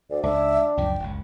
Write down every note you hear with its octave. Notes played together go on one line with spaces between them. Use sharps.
D2 D5
C#2 D4 E5
C#2 F#2 F3 G5
F#1 C#2